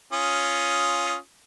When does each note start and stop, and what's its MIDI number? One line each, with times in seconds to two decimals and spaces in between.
0.13 1.16 61
0.13 1.16 65
0.13 1.16 87